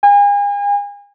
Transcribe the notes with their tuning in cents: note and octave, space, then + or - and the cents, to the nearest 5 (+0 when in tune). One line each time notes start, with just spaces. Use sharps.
G#5 -40